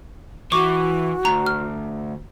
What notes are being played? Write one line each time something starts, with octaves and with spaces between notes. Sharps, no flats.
E3 F#4 C#6 D6
D2 A#5
F6